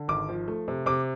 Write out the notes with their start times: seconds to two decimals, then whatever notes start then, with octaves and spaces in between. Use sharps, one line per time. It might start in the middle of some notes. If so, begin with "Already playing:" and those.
Already playing: D3
0.08 G#1 D6
0.29 F3
0.48 A3
0.68 C3
0.86 C3 D6